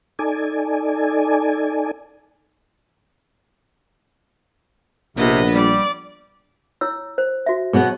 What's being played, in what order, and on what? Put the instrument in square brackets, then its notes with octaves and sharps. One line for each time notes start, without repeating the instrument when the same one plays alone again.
[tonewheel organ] D#4 A4 D5 G#5
[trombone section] A#1 [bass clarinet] C3 [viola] B3 D#5
[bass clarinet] G3 [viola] D5
[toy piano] E4 C#5 E6
C5
F#4 E5
[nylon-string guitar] B2 F#3 B3 [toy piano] G#4